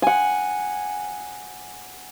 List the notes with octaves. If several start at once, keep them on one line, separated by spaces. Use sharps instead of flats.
F#5 G#5